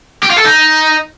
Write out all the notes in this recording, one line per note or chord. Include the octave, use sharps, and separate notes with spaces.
G4
F4
A4
D#4